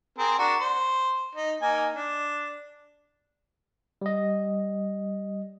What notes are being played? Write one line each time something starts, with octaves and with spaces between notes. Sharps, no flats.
C4 G#4 A#4
D4 F#4 A#4
C5
D#4
A#3 D#4 G#5
D4
G3 D#5